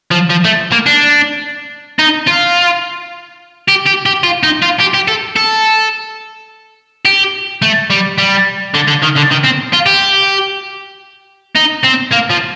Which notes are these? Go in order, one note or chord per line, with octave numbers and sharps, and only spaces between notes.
F3
F3
A3
A#3
D4
D#4
F4
G4
G4
G4
F4
D#4
F4
G4
G4
A4
A4
G4
A3
G3
G3
D3
D3
D#3
D3
D#3
C4
F4
G4
D#4
C4
A#3
F3